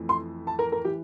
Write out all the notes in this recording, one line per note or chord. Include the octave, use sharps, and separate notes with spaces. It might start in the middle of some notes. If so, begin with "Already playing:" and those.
Already playing: F2 E3 A3
C6
A5
A#4
A#4
E3 G4